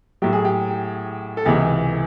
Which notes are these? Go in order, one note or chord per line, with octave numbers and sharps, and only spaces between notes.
A2 F#3 G4
G#4
G4
A4
C#2 C3 E3 G#4